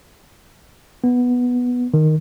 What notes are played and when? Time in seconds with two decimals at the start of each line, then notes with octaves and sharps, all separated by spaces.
1.04 B3
1.94 D#3